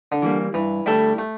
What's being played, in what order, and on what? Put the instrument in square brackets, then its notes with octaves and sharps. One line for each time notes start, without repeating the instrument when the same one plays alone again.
[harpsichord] D3
[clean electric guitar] E3 G3 A#3
[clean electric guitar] G2 [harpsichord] E3
[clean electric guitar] D3 A3 E4 A4 [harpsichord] G3
[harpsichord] A3